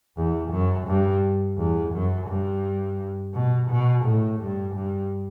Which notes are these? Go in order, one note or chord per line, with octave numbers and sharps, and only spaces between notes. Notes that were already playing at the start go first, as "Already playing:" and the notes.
E2
F#2
G2
E2
F#2
G2
B2
B2
A2
G2
G2